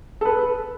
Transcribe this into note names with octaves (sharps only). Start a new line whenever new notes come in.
A4
B4